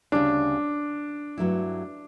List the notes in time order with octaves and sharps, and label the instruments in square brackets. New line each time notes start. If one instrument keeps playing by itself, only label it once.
[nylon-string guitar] D2 C#3 G3 C#4 [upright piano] D4
[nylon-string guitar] G2 F#3 A3 E4